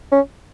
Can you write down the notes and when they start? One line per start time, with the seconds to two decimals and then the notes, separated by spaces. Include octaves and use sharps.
0.12 C#4